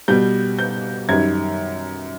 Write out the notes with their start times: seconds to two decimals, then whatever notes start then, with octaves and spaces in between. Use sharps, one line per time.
0.08 B2 G3 G6
0.59 G6
1.09 F#2 D#3 G3 G#6